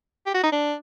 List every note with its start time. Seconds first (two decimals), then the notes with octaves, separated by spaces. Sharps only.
0.26 G4
0.34 F#4
0.44 D#4
0.52 D4